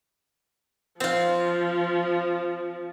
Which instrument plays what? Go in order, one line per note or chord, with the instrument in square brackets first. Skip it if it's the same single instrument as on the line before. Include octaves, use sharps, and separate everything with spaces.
[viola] F3 [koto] C4 F4